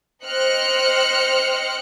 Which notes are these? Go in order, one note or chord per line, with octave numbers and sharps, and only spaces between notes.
C5 D#5 G5 F6 F#6 C#7